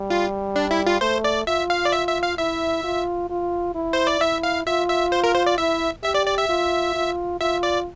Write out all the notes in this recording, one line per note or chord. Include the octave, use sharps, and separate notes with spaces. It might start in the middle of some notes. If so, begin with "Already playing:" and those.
Already playing: G3
F4
D4
E4
F4
A3 C5
D5
F4 E5
F5
D5
E5
E5
F5
E4 E5
F4
F4
E4
C5
D5
E4 E5
F5
F4 E5
E5
C5
A#4
C5
D5
E4 E5
G4 E5
D5
D5
E5
F4
F4
F4 E5
D5